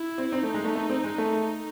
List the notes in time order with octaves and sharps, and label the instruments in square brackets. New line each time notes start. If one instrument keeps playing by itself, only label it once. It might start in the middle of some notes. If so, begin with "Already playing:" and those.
Already playing: [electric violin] E4
[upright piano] C4
[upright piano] C4 [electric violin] D#4
[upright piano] A3
G#3
A3
A3
C4
G#3
A3